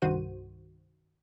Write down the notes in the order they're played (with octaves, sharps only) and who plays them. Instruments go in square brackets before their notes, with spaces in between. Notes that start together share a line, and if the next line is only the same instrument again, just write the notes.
[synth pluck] C2 G2 D#3 F#4 C5 D#7